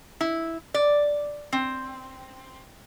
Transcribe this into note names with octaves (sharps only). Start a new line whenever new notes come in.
E4
D5
C4